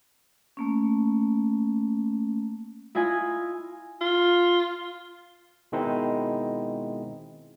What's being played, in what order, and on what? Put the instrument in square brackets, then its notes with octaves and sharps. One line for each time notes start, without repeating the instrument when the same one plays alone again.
[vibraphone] A3 A#3 C#4
[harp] E4 F4 D#5 G#5
[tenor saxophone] F4
[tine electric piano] B2 D#3 G#3 C4 D#4 E4